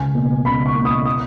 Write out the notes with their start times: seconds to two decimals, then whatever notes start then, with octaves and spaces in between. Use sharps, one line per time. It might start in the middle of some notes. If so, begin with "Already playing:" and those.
Already playing: C#2 G#5
0.15 B2 A#3
0.45 C#2 B5
0.66 C#6
0.75 B2 A#3
0.85 D#6
1.06 D#6